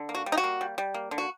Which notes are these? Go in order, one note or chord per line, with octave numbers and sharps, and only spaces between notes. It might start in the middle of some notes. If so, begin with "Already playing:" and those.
Already playing: D3
A#3
F#4
G3
D#4
F#4
A#3
G3
G3
A#3
D3
F#4